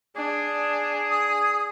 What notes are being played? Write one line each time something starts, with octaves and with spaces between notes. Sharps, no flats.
D4 G#4
D#6